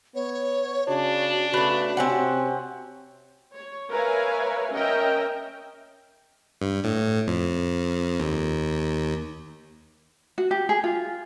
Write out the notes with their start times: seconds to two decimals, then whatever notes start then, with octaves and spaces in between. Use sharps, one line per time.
0.15 B3 C#5
0.88 C#3 D4 F#4
1.54 C#3 A3 B3
1.97 C3 C4 C#4 F#5
3.54 C#5
3.90 A#4 B4 C#5 E5 F5 G#5
4.72 C#4 A#4 D#5 E5 G5
6.61 G2
6.84 A2
7.27 F2
8.20 D#2
10.38 F#4
10.51 G4
10.69 G#4
10.84 F4